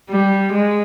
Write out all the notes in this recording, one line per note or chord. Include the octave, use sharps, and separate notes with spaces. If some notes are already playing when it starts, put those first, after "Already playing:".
G3
G#3